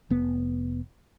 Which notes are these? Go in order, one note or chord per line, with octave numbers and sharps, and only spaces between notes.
F1 B3